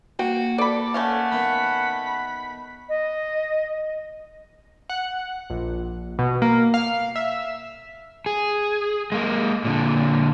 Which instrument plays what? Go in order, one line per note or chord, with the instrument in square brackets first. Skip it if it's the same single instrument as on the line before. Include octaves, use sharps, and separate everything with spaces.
[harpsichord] A#3 [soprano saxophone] F#4 [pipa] G5
[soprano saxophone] A4 [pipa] D5 B5
[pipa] A3 C#4 F5 [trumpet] F#5
[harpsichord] D#3 B3 [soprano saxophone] B5
[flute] D#5
[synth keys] F#5
A#1
B2
A#3
F5
E5
[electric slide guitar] G#4
G#3 A#3
A#2 D3